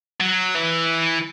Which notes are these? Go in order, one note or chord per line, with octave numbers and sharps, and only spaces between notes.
F#3
E3